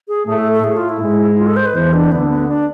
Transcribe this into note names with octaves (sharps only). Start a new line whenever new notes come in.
G#4
A2 A3 G#4
A4
A4
A2 A3 G#4
F4
E4
G#2 G#3
F4
A4
C5
B4
E2 E3 C5
D4
D2 D3 B3
B3
D4